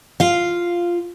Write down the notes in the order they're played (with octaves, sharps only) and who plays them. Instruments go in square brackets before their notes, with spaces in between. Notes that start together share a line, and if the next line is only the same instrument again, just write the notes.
[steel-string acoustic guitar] F4 F5